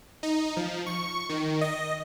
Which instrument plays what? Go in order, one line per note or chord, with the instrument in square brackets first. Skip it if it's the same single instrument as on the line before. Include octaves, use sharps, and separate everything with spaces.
[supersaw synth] D#4
F3
C#6
D#3
D#5